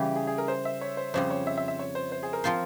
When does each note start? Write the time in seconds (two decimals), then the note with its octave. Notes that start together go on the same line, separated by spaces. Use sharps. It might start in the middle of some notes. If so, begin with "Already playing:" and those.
Already playing: C#3 E3 G3 G4
0.16 G#4
0.27 G#4
0.38 A#4
0.48 C5
0.65 E5
0.81 C#5
0.97 C5
1.14 F2 C#3 G3 C5
1.30 C#5
1.47 E5
1.57 E5
1.68 E5
1.79 C#5
1.95 C5
2.12 C5
2.23 G#4
2.33 A#4
2.44 F3 C4 F4 C5